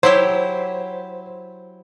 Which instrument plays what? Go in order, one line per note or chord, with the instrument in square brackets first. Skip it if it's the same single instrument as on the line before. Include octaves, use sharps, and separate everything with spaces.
[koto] F#3 E4 G4 [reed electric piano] C5